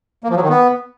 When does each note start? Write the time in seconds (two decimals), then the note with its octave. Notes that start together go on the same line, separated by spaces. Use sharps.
0.24 A#3
0.30 F3
0.36 F#3
0.43 D#3
0.49 B3